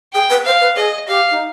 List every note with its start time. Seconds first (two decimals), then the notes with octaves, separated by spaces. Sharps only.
0.13 G#4 G5
0.30 B4
0.45 C5 F5
0.61 B4
0.76 G#4 D#5
1.08 G4 F5
1.31 D#4